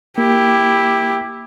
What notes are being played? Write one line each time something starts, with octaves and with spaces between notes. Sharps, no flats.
A#3 E4 G4